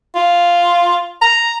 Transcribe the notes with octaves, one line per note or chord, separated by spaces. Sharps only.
F4
A#5